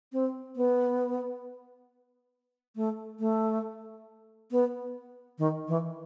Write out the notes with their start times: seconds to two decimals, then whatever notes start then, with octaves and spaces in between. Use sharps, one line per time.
0.13 C4
0.56 B3
2.76 A3
3.19 A3
4.51 B3
5.38 D#3
5.68 E3